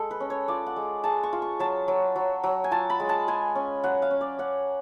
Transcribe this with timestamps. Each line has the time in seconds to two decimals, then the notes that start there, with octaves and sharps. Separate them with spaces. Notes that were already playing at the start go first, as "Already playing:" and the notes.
Already playing: G#3 A4
0.11 B4
0.20 C#4
0.30 C#5
0.48 F4 D5
0.66 F#5
0.76 G#3
1.04 G#3 A5
1.23 C#6
1.33 F4
1.42 C#6
1.60 F#3 A5
1.88 F#3
2.16 F#3
2.44 F#3
2.64 G#5
2.71 F4 A5
2.90 B5
3.00 G#3
3.09 A5
3.28 G#3 G#5
3.55 C#4
3.84 F#3 F#5
4.02 F5
4.11 C#4
4.21 D5
4.39 C#4 F#5